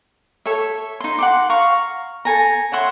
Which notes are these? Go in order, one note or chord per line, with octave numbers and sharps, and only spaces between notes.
A4 C#5 E5
D#4 C6
F#5 C6 D6
F5 A#5 C#6
A4 G#5 A#5
C#5 E5 F#5 C6